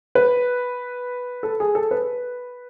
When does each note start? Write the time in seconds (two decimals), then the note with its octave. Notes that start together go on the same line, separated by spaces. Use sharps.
0.15 B4
1.43 A4
1.60 G#4
1.75 A4
1.91 B4